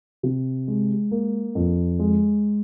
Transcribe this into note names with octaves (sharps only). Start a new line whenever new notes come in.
C3
G#3
A#3
F2
G#3